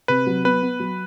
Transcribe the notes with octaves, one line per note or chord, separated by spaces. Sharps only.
C3 B4
F#3
B3 B4
B3
F#3